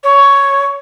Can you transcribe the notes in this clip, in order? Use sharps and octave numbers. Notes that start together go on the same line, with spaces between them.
C#5